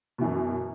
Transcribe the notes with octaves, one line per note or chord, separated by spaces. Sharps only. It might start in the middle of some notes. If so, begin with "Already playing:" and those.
F#2 B2 E3